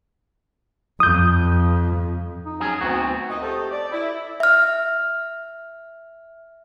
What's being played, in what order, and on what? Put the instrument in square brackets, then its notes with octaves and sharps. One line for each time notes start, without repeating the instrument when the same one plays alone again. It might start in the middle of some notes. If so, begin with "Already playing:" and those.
[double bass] F2 [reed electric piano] D#6 G6
[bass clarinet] D#4
[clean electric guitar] F#3 C#4 G#4
[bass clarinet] D2 [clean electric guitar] B3 C4 F#4
[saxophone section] A#2 D#4 D#5
A3 C4 G4 A4
D5
E4
[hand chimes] E5 F6